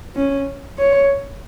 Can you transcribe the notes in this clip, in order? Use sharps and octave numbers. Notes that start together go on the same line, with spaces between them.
C#4
C#5